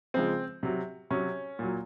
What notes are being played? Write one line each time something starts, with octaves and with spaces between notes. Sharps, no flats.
C#3 F3 G#3 C4
C3 F#3
C3 F#3 C#4
A#2 F#3